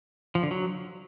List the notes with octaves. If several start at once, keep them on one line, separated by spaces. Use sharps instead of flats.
F3
D3
F#3